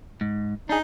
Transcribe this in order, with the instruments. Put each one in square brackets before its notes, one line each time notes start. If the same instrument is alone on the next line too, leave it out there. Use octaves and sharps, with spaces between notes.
[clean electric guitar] G#2
[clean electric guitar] D4 G#4 [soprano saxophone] D#4